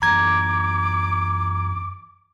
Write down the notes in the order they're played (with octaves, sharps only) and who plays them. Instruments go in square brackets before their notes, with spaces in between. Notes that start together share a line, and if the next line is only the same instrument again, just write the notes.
[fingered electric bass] F#2 E3 D4 [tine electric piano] A#5 G#6 [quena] D6